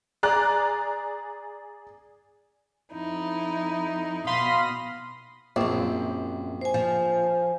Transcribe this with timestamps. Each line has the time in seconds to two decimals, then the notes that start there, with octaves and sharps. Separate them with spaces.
0.23 G#4 D5 A#5 F#6
2.92 F2 D#4 E4
4.27 B2 F5 B5 C6 D#6 A#6
5.56 A#1 F#2 C4
6.61 C5 G#5
6.74 F3